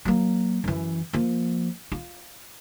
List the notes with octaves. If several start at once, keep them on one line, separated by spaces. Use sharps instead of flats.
F#3 A#3
F#2 E3
F3 A#3
F4